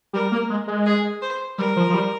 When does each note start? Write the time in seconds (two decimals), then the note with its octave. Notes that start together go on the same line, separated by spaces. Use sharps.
0.13 G3 A#4
0.32 A#3
0.50 G#3
0.67 G#3
0.86 G#4
1.22 C5
1.58 G3 A#4
1.76 F3
1.90 F3
1.94 G3